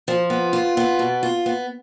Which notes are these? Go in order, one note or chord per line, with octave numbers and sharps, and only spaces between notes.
F3
B3
F4
B3
B2
F4
B3